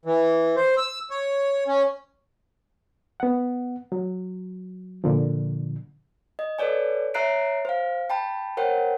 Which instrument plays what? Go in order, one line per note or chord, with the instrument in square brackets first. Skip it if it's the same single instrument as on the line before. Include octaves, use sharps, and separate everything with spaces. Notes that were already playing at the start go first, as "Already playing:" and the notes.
[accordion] E3
C5
E6
C#5
C#4
[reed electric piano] B3 F#5
F#3
A#2 D3 F3
[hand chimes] D#5
A4 B4 C#5 D5 G#5
C#5 E5 A#5 F#6 C7 D7
C5 F5
G5 A5 B5
A#4 C5 C#5 F#5 G5